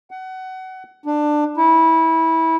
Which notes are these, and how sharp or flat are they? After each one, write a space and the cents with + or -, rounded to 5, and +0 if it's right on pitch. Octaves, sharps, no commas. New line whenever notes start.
F#5 +25
D4 +20
E4 -20